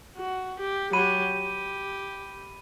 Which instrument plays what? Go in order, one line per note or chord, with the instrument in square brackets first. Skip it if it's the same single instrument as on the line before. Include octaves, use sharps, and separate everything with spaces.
[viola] F#4
G4
[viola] F#3 G4 [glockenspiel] B5 D#7
[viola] G4